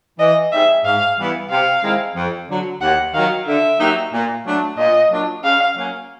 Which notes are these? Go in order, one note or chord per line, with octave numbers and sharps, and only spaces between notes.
E3 D#5
G3 C4 D#4 G#4 E5
G#2 F5
E3 G3 B3 E4
C3 F5
D#3 G#3 C4 E4
F2
D3 F#3
D#2 F#5
D#3 F#3 F5
D3 E5
F#3 A#3 D#4 G4
A#2
F#3 A3 D4
A#2 D#5
F#3 A#3 D4 F4
C#3 F5
F#3 A#3 C#4